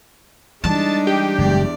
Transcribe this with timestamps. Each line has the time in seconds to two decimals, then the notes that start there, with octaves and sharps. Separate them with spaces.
0.64 E3 G3 G#3 D4 D#4 A5
1.07 G4
1.38 F#1 E2 G#3 D5